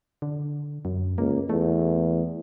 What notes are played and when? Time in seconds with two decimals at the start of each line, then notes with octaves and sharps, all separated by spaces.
0.22 D3
0.85 F#2
1.18 C#2 A#3
1.49 E2 A3